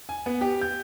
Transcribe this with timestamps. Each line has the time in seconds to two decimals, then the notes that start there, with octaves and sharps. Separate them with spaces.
0.09 G#5
0.26 B3
0.41 G4
0.61 G6